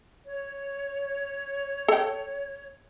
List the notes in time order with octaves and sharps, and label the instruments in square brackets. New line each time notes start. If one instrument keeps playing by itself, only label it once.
[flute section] C#5
[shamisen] A4 G5